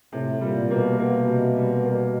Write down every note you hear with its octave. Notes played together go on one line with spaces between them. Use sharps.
A2 C3
A#2 G3
B2 A#3
B2 A#3
C3
G3
A#3